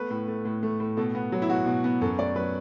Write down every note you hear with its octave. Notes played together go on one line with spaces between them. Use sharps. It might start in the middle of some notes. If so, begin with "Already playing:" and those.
Already playing: A3 B3 B4
A2
A3
A2
A3
A2
B2 A4
B3
F#3
E4
B2 F#4
B2
B3
F#2 A4
A3 D5
F#3 B4